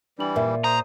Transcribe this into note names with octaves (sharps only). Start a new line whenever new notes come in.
E3 G3 D4 F#7
A#2 A#4 E5
C5 A#5 D#6